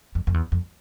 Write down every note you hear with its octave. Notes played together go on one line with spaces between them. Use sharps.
F2
F2
E2
F2